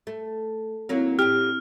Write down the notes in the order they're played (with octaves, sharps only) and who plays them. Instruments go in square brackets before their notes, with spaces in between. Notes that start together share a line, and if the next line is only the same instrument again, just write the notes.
[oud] A3
[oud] D#2 F#3 A#3 [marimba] C4 E4
[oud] A2 D3 G4 [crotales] F6